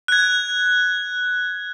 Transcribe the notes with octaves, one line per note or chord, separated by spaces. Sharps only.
F#6 G#6